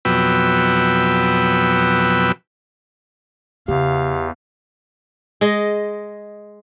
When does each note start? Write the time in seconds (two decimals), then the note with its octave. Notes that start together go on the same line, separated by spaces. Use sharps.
0.05 F2 B2 F#3 B4 G5 E6
3.68 E2 C#3 G4 F5
5.41 G#3 D#5